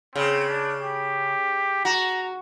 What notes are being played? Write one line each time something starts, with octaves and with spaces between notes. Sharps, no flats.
C#3 C4
D4
G4
F#4 A#5